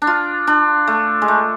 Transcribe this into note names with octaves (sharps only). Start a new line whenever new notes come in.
D4
F4
D4
A3
G#3
A3